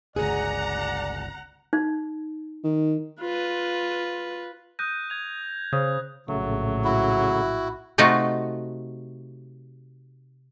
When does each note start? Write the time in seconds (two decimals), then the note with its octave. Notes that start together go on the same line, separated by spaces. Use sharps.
0.16 G1 C#2 G#4 D5 F#5 A#5
1.73 D#4
2.64 D#3
3.21 F4 B4
4.79 D#6 F#6 G6 A#6 D#7
5.10 G#6 F7
5.73 C#3 C5 D#6
6.28 A#1 A2 C#3 F#3 A3
6.84 E4 F#4
7.98 C3 A3 D#4 F4 F#4